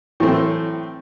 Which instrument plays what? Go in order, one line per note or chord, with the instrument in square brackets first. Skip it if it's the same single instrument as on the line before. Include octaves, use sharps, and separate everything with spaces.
[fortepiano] A2 E3 F#3 A3 C4